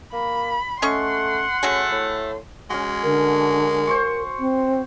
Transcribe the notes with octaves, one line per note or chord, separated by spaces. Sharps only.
A#3 B5
A3 C#4 D#5 F#5 C6 C#6
A3 C#4 F#4 G#4
A2
G#3 C#4 F#4
D3 A#4
C5 C6 C#6
C4